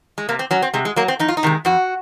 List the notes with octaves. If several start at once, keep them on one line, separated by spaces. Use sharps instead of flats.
G#3
C3 A#3
C4
F#3 C#4
C4
C3 G#3
G#3
F#3 A#3
C4
F2 D#4
F4
D#4
C3 D#3 G#3
F2 F#4